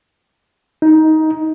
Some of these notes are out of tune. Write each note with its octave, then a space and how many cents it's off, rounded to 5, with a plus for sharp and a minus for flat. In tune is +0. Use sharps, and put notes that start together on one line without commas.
D#4 +15